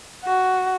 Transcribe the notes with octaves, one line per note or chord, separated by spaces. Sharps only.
F#4